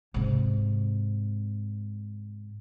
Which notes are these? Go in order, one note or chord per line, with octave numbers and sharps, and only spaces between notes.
G#2 C3